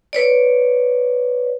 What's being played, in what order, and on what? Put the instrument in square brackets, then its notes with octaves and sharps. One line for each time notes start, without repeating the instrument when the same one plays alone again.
[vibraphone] B4 C#5 D5